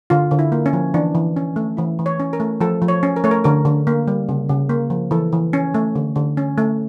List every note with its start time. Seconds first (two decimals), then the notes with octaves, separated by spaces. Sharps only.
0.10 D3 F4
0.31 D3
0.39 E4
0.52 A#3
0.66 C#4
0.73 F3
0.94 E3 D4
1.15 E3
1.37 C#4
1.56 A3
1.77 E3 E4
1.99 E3
2.06 C#5
2.20 C#4
2.33 A#4
2.40 A3
2.61 F3 A4
2.82 F3
2.88 C#5
3.03 C#4
3.16 A#4
3.24 A3 C#5
3.31 A#4
3.44 D3 A#4
3.65 D3
3.87 A#3
4.08 G3
4.29 C#3
4.49 C#3
4.69 A#3
4.90 F3
5.11 E3 A4
5.32 E3
5.53 C#4
5.74 A3
5.95 D3
6.16 D3
6.37 C#4
6.58 A3